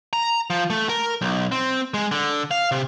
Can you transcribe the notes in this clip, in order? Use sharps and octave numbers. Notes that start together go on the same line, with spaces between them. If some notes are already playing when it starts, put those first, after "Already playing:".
A#5
F3
A3
A#4
B1
C4
G#3
D3
F5
C3